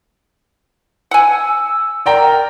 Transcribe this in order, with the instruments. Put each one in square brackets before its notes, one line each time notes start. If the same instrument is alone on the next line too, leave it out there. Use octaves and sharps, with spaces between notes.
[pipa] F#5 G#5 [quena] E6
[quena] A#4 [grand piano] D5 G5 A#5